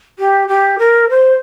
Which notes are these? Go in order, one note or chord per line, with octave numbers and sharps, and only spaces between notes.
G4
G4
A#4
C5